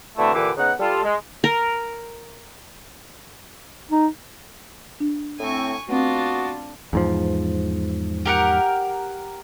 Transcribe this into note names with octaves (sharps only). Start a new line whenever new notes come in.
B2 D3 A3 C4 D4 E4
A#2 D3 E3 G4 B4 D6
C#3 B3 D#4 F#5
G3 F4 A4
G#3
A#4
D#4
D4
A2 A3 C4 G#5 C#6
A3 B3 C4 D4 F4 F#4
E2 G#2 F3
G4 A#4 F#5